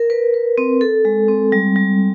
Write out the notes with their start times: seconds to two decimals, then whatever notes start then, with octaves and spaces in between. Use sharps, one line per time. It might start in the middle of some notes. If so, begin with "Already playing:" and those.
Already playing: A#4
0.10 B4
0.34 B4
0.58 C4
0.81 A4
1.05 G#3
1.28 C4
1.52 G3
1.76 G3